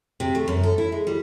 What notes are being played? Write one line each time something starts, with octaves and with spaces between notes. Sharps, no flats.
C3
A3
F#2
A4
E4
G#3
G3